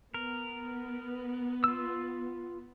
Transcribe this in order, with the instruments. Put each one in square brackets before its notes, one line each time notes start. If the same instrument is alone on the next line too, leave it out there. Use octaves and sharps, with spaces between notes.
[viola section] B3 [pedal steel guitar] A#4
[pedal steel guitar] F4 E6